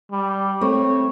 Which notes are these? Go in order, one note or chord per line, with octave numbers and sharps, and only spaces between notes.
G3
A3 C4 C#5